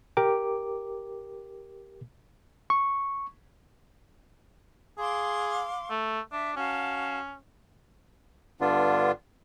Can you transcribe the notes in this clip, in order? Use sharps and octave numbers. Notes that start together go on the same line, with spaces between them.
G4 A#4 D6
C#6
G#4 F5 C6 D6
A3
D4 E5
C#4 F#4 F5 A5
G2 D3 B3 D4 F4